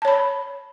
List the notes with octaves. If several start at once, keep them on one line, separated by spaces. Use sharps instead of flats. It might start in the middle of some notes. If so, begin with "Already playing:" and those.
C#5 A5 B5